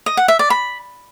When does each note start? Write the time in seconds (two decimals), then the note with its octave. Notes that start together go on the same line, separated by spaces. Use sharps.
0.06 D#5
0.17 F#5
0.28 E5
0.39 D5
0.50 B5